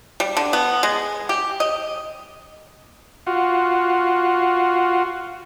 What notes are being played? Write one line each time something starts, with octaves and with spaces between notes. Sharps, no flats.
G3
D3
B3
G#3
G4
D#5
F4 F#4